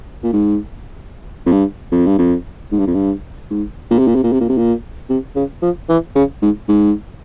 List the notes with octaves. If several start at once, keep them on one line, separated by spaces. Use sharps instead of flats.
A#2
G#2
F2
G2
F2
G2
F2
G#2
G2
F2
G2
G#2
A#2
C3
A#2
C3
A#2
C3
A#2
C3
A#2
C3
C#3
F3
E3
C#3
G#2
G#2